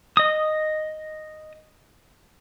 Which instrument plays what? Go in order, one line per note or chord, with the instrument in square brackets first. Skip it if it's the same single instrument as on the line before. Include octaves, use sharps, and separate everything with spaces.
[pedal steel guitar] D#5 D#6